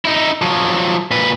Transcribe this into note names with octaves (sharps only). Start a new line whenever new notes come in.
D#4 E4
F3 F#3
A#2 B4